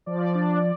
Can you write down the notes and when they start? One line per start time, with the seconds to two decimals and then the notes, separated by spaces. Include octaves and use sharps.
0.06 F3 D5
0.35 D4